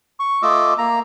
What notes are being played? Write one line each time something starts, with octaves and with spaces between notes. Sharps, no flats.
C#6
A3 F4 D#5 D6 E6
A#3 A#5